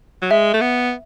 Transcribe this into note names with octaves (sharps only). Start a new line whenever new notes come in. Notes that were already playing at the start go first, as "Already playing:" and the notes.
F#3
G#3 E5
A3
B3